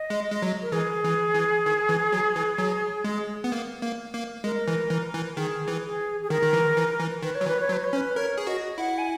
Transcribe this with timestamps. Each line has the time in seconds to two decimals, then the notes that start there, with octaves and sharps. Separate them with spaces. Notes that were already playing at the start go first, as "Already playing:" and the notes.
Already playing: D#5
0.10 G#3
0.31 G#3
0.42 F#3
0.62 A#4
0.72 E3 G#4
1.04 E3
1.34 E3
1.66 D#3
1.89 E3
2.13 F#3
2.36 E3
2.58 F#3
3.04 G#3
3.44 B3
3.52 A#3
3.82 A#3
4.14 A#3
4.44 G#3 A#4
4.68 E3
4.90 E3
5.14 E3
5.37 D#3 G#4
5.68 E3
5.84 G#4
6.23 G#4
6.30 D#3 A#4
6.43 D#3
6.53 E3
6.77 E3
7.00 E3
7.23 D#3 B4
7.35 C#5
7.41 F#3
7.46 E3 B4
7.61 C#5
7.69 F#3
7.73 B4
7.84 C#5
7.93 C#4
7.97 B4
8.16 A#4 C#5
8.38 G#4
8.47 F#4 D#5
8.78 E4 F#5
8.98 G#5